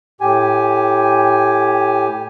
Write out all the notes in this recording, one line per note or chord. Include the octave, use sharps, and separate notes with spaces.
A2 G4 G#5